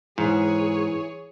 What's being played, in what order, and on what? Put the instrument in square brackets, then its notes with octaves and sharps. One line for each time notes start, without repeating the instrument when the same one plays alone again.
[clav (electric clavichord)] G#2 [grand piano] E3 [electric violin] G#4 C#5